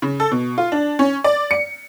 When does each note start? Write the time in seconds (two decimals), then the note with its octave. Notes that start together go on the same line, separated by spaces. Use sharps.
0.02 C#3
0.20 A4
0.32 B2
0.58 F4
0.72 D4
0.99 C#4
1.24 D5
1.51 C#7